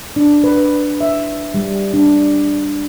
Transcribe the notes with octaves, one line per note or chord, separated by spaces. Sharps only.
D4
B4
E5
G3
D4